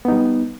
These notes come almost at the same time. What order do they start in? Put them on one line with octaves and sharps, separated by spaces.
B3 D#4 G3